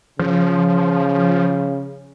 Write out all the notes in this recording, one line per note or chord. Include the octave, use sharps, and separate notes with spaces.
C#3 F3